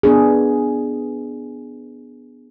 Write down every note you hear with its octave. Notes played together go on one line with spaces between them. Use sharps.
B3 D4 G#4